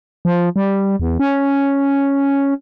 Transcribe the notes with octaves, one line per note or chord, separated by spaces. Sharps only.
F3
G3
E2
C#4